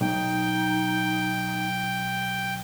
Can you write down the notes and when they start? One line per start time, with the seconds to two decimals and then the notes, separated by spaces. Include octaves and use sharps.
0.01 B1 D#4 G5